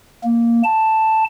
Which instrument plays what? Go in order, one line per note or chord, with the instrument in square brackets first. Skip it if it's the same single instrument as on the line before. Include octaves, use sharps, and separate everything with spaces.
[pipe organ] A#3
A5